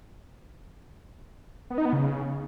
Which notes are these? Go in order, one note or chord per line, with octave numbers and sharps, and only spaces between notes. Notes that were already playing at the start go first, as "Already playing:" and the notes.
B3
D#4
B3
C#3